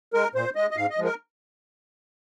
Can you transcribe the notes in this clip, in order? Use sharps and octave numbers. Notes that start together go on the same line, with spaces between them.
G#3 A#4
A#2 C5
G#3 D#5
D#5
G#2 F5
D#5
F3 G#3
A#4